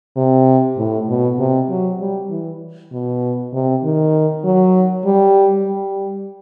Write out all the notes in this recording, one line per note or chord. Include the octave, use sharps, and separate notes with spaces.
C3
A2
B2
C3
F#3
G3
E3
B2
C3
D#3
F#3
G3
G3